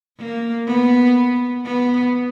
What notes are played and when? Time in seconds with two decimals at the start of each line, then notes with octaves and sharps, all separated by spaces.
0.19 A#3
0.67 B3
1.64 B3